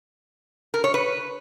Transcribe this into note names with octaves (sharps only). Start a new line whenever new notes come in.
A#4
C#5
B4